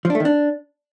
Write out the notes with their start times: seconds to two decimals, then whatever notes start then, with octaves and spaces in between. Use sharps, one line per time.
0.05 F3
0.10 D4
0.15 A3
0.20 D#3
0.25 D4